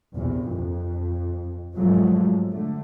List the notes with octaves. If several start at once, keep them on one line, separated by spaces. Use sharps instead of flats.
A#1 E2 C3
F2
G#2 C3 F3 F#3 G#3 A3
D3 A3